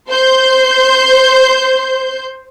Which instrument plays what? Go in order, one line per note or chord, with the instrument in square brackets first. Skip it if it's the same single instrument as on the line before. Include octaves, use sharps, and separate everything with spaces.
[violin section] C5 C6 G6